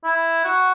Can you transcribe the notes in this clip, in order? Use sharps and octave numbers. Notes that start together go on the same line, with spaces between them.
E4
F#4